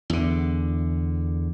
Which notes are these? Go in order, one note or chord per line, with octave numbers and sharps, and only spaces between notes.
E2 D3